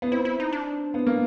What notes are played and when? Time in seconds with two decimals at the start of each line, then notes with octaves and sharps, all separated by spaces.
0.02 B3
0.12 C4 E4
0.25 E4
0.40 D#4
0.52 D4
0.94 B3
1.07 A#3